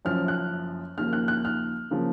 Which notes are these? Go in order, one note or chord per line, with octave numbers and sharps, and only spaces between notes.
F#1 F#2 F3 F6
F#6
D#2 C#3 F3 A#3 F6
F#6
F#6
F6
C#3 F3 A#3